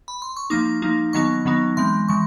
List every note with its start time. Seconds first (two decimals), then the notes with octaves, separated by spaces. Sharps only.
0.08 B5
0.22 C6
0.37 C#6
0.50 F3 A#3 D#4 D6
0.82 F3 A#3 D#4
1.13 D#3 F#3 B3 D#4 C#6
1.45 D#3 F#3 B3 D#4
1.77 E3 G#3 C4 C6
2.08 E3 G#3 C#6